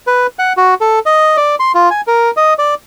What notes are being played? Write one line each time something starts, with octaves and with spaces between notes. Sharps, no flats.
B4
F#5
F#4
A4
D#5
D5
C6
F4
G#5
A#4
D#5
D5